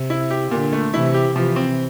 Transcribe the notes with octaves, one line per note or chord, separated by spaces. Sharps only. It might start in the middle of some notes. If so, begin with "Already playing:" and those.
Already playing: C3
E4
G4
A#2 D3
A3
C3 E3 E4
G4
C3 E3 F3
C4